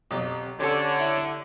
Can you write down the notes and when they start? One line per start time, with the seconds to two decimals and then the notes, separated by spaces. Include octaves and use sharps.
0.11 B1 F2 G4
0.60 D3 C#4 G4 A4 C5 C#5
0.99 E4